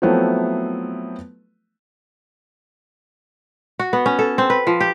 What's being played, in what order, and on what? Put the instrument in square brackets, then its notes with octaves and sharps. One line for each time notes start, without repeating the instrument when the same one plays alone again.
[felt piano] F3 F#3 A3 B3 C4 E4
[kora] F#4
B3
C#4
A4
C4
B4
F3
G4